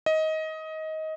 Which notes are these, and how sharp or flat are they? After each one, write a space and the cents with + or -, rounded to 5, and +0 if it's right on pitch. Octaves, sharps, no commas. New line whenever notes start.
D#5 +20